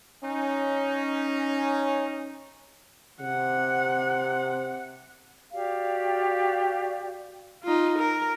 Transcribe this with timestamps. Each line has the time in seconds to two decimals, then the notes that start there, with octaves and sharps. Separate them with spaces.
0.24 C#4 D#4
3.21 C3 F#5
5.53 F#4 G4 D5 F5
7.64 D#4 F4
7.99 A#4